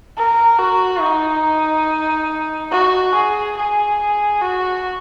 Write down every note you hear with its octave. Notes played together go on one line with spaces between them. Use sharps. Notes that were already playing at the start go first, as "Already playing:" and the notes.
A#4
F#4
D#4
F#4
G#4
G#4
F#4